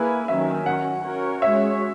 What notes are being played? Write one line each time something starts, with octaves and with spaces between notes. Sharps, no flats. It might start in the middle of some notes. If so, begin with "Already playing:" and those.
Already playing: A#3 E4 G#4 B4 G#5
D#3 F#3 C#4 F#4 E5
F#3 C#4 F#4 F#5
C#4 F#4 A#4 C#5
G#3 C#4 F#4 C#5 E5